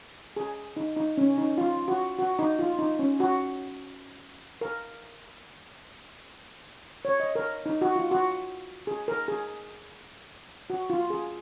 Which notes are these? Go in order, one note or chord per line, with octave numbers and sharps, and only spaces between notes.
G#4
D#4
D#4
C#4
D#4
F4
F#4
F#4
D#4
F4
D#4
C#4
F#4
A#4
C#5
D#5
A#4
D#4
F#4
F4
F#4
G#4
A#4
G#4
F#4
F4
G#4